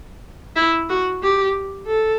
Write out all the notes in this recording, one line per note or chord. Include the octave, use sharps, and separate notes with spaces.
E4
F#4
G4
A4